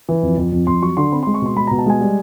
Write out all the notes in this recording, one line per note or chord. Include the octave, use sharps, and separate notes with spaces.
E3
F2
F2
F2
F2 C6
F#3 C#6
D3 C6
C4 B5
G#3 C6
C#6
B2 C6
G#3 B5
B2 A#5
A5
G#3 G#5
G3